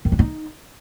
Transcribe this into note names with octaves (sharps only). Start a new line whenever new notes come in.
D#3
D4
D#4